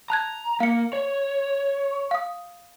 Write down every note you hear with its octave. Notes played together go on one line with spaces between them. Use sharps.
A5 A#5 F#6 G#6
A#3 F5 C#7
C#5
F5 D#6